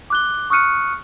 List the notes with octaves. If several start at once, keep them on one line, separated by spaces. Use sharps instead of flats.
D6 F#6 G7
C#6 D#6 F6 F#6 C#7 D#7